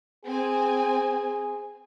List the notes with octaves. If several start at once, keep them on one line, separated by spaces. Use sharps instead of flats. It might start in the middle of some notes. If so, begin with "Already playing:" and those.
C4 G#4 G#5